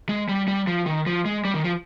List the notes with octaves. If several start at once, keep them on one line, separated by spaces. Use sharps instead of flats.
G#3
G3
G3
F3
D#3
F3
G#3
G3
D#3
F3